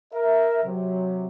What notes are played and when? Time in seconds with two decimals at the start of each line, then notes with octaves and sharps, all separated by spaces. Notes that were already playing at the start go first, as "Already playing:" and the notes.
0.13 A#4 E5
0.64 C3 F#3